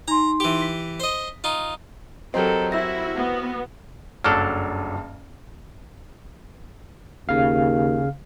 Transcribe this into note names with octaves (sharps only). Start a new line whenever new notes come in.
D#4 A#5 C6
E3 G4
B6
C5 D#5
D#4 F4
F#3 C4 G4 A4 A#4 D#5 A#5 G6
E4 F#4 E6 A#6
B3
F#1 G2 F#3 D4 A4 F6
D#2 C#3 F5